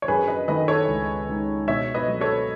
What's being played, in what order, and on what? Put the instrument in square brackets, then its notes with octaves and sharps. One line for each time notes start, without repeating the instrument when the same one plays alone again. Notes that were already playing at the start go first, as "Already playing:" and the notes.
[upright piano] C#5
[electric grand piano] F#2 [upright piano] G#4 B4
[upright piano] B4 D#5
[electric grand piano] D#3 A3 E4 [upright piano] B4 D#5
[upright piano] A4 C#5
[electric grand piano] C#2
C#3 G#3 D#4
[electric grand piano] B2 [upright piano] C#5 E5
[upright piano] B4 D#5
[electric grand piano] F#3 A3
[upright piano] A4 C#5